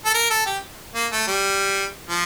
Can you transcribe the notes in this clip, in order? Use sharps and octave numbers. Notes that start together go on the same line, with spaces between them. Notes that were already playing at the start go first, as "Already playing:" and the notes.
A4
A#4
A4
G4
A#3
A3
G3
F3